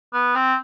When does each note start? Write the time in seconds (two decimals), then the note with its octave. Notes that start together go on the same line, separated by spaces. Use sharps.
0.13 B3
0.35 C4